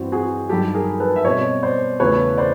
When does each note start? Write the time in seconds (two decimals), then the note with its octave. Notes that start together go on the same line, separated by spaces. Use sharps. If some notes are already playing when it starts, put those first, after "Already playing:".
Already playing: G2 E3 G3 C4 F#4
0.12 F#4 G#4
0.49 G2 D#3 F#3 G4 A4
0.74 G#4 A#4
1.00 A4 B4
1.16 E5
1.25 B2 G3 C4 C#5 D#5
1.63 C5 D5
2.00 E2 C#3 E3 A3 B4 C#5
2.38 C5 D5